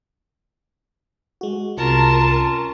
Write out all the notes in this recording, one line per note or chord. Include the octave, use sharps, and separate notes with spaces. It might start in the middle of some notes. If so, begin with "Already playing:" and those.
G#3 F#4
C2 C3 C#4 F4 A#4 A5